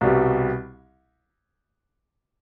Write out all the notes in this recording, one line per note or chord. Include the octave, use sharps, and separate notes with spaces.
C2 B2 G3